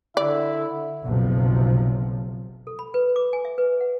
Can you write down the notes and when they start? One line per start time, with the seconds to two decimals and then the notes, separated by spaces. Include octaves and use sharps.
0.17 D3 E4 D5 E5
1.03 F#1 B1 C3 F3
2.67 A4
2.79 B5
2.94 B4
3.16 D6
3.33 G#5
3.45 E5
3.58 B4
3.80 F#5